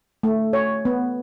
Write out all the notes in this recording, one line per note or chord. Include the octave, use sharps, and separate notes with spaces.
A3
C#5
B3